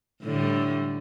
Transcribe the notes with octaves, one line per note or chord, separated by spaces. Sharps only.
A2 D3 G3